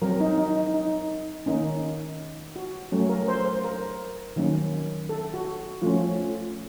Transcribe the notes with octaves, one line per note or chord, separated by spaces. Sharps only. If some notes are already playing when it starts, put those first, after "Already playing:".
F#3 C4 A#4
D#4
D#4
D#4
D#4
D#3 A#3 C#4 D#4
F#4
F#3 A3 C#4
A#4
C5
C5
A#4
D#3 F#3 A#3 C#4
A4
F#4
F3 A3 C#4 F4